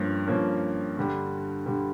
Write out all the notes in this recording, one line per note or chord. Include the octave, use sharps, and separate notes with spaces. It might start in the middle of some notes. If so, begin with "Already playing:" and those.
Already playing: G2 F3 A#3 C#4
G2 F3 A#3 C#4
G2 D3 G3
D3 G3